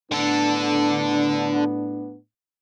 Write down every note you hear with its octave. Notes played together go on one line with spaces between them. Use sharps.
A2 D3 B3 D4 A4